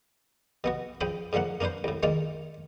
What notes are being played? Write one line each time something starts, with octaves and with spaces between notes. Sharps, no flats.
B2 B3 F#4
C#3 F3 G5 B5 D#6
G#2 D3 F3 A#3 F#5
A#3 C#4 D4 B4 C5
C2 A2
D#3 G#3 A#3 F4 D5